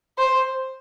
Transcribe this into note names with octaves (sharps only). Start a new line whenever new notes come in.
C5